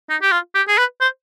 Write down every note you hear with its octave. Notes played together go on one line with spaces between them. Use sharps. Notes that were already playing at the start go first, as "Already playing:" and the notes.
D#4
G4
F4
G4
G#4
B4
C5